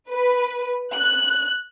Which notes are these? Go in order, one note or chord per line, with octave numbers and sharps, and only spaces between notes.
B4
F#6